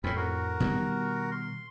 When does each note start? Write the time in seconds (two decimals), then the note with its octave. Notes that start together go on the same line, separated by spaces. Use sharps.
0.04 F2 A2 C4 C#4 B5
0.16 F#4 A#4
0.60 B2 D#3 G3
1.32 C6